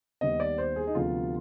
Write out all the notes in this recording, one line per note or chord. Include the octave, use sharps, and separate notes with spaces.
D#2 D#3 G3 B3 D#5
D5
C5
G#4
D#4
D2 C3 F3 B3 F4